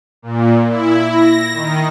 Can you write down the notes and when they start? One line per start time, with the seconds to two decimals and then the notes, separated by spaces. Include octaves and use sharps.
0.22 A#2
0.68 E4
1.12 A#6
1.53 D#3